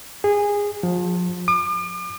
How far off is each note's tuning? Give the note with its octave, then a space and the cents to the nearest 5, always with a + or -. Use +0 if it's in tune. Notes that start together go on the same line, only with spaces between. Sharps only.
G#4 -20
F3 +30
D6 +45